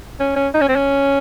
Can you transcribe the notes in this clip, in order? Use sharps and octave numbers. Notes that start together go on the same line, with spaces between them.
C#4
C#4
D#4
C#4
C4
C#4